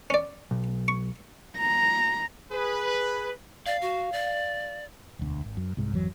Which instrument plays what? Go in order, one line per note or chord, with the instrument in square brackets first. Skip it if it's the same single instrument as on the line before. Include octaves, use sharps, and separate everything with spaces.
[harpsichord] C#4 D5
[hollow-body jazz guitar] B1
[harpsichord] C#6
[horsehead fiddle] A#5
[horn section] G#4 B4
[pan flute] D5 [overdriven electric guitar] F5
[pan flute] F#4
D5
[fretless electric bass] E1 D2
G#1
F#2
C2 G#2
G#1 F2 E3 F#3